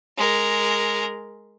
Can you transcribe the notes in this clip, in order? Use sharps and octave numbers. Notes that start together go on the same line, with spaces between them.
G#3 A#4